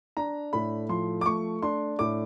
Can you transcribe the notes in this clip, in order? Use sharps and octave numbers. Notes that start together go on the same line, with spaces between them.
D4 A#5
A2 B5
F3 C6
D6
A3 C#6
D4 C6
A2 D6